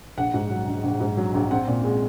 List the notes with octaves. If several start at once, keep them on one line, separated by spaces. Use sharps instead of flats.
A#1 F#5
G#2
F#3
A#1
A#1
G#2
F#3
A#1
C4 F#5
A#2
G#3